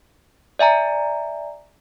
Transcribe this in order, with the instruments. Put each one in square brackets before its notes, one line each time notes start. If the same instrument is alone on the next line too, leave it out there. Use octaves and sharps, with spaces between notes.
[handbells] D5 E5 G#5 A#5